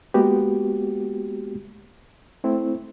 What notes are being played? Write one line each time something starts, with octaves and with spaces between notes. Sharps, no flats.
G#3 A#3 B3 F#4 G4
A3 C4 E4